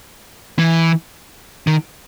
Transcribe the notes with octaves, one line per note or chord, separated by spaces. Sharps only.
E3
D#3